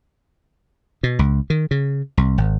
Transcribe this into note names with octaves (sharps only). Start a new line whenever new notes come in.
B2
C#2
D#3
C#3
C2
G#1